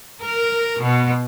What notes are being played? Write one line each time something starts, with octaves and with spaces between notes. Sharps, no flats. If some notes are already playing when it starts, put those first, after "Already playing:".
A#4
B2